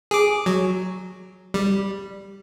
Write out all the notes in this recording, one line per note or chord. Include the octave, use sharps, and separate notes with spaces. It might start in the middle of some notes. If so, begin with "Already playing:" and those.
G#4 D6
F#3
G3